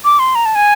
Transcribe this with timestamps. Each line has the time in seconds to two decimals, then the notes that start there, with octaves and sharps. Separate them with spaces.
0.05 D6
0.19 C6
0.35 A#5
0.45 A5
0.55 G#5